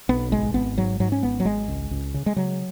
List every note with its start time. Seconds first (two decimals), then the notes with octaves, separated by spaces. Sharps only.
0.09 B1 B3
0.31 G#1 G#3
0.54 G#1 B3
0.78 G#2 F#3
1.00 G#2 F#3
1.12 C#4
1.23 G#1 B3
1.40 F#3
1.45 G#1 G#3
1.68 C#2
1.91 C#2
2.14 C#3
2.26 G#3
2.36 C#3 F#3